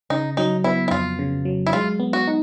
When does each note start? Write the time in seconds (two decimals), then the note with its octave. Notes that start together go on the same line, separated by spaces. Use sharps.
0.10 C#3 D#4
0.37 F#3 D#4
0.64 B3 E4
0.88 E4
0.91 F2 F4
1.19 C#3
1.45 F#3
1.67 E4
1.73 G#3 F4
2.00 B3
2.13 F#4
2.27 D#4